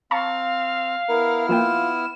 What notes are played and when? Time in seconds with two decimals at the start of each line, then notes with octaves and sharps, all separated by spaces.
0.11 C4 F5 A5 A#5 C#6
1.09 B3 E4 A#4 F6
1.49 F3 A#3 F4 G5 E7